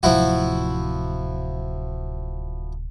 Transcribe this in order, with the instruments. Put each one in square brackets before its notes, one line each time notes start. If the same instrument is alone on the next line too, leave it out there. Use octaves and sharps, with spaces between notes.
[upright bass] D1 C3 [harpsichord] F3 E4 F#4